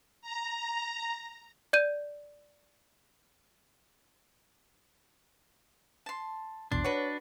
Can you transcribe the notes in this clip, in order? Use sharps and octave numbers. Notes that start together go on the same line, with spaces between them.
A#5
D5 G6 D#7
A5 C6
A#1 E2 B2 D4 C6
F#4 B4 C#5